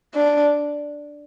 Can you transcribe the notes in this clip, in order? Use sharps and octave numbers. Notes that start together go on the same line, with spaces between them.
D4